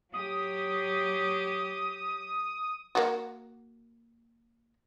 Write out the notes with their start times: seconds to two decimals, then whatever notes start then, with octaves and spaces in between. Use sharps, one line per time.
0.14 F#3 G4 D#6
2.95 A#3 F4 F#4